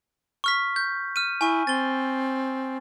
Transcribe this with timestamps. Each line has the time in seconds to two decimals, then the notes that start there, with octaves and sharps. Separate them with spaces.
0.44 C#6 F6 B6
0.76 G6
1.16 F6 D#7
1.41 E4 G#5 C#6
1.67 C4 A6 G7